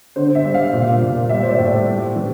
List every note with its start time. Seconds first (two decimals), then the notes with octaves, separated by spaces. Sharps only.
0.16 D3 C5
0.35 E5
0.44 G3
0.54 F5
0.73 A#2
1.01 A#2
1.29 G3 E5
1.43 C5
1.49 D5
1.58 A2
1.68 C5
1.87 G3
2.16 E3